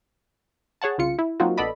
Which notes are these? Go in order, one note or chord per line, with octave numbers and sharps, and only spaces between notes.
G#4 C#5 F#5 A5
C2 C#3 F4 C#7
E4
F#3 A#3 C4 D#4 F4 F#4
A#1 B3 A4 D5 D#5 B5